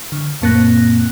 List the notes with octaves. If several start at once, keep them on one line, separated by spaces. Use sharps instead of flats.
D3
F#2 A#2 A#3 C4 F#6 A#6